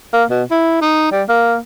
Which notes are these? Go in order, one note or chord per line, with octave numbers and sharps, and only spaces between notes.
A#3
B2
E4
D#4
G3
A#3